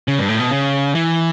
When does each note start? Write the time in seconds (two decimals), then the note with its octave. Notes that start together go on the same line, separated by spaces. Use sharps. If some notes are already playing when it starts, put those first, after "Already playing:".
0.08 C#3
0.18 G2
0.29 A2
0.40 B2
0.51 C#3
0.95 E3